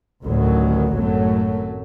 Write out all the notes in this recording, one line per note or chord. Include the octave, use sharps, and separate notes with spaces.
A1 D2 D#3 F#3
G#1 F#2 A2 F#3 A3